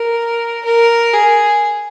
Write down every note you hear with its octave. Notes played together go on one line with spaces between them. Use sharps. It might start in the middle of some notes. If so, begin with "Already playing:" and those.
Already playing: A#4
A#4
G#4